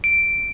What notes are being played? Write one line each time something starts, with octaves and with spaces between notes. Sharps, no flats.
D7